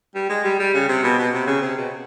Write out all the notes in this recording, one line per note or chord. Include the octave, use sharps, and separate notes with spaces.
G3
G#3
G3
G3
C#3
C3
B2
B2
C3
C#3
C3
B2